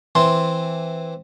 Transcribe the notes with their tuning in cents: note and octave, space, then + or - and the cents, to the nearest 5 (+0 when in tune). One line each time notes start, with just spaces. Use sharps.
E3 +0 C4 +0 C6 +0